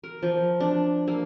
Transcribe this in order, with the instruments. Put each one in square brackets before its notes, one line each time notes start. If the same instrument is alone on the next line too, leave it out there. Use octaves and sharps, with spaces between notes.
[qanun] A#4
F3
D4
A#3